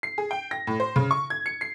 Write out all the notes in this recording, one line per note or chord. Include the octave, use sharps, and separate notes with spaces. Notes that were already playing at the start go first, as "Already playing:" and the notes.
C7
G#4
G5
A#6
A2
C5
C#3
C#6
G#6
C#7
C7